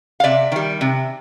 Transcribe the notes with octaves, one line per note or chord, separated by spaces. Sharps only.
F5
C3 D5 E5
D#3 G3
C3